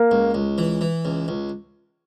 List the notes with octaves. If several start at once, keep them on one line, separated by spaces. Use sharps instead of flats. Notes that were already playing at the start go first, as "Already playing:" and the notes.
Already playing: A#3 A#4
C#2
C#2
E3
E3
C#2
C#2